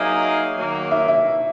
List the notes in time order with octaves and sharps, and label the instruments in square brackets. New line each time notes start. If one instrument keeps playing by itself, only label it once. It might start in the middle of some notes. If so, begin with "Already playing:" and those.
Already playing: [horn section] F#3 A#3 D#4 G#4 [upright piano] E5
[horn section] D#3 F#3 A#3
[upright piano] E5
E5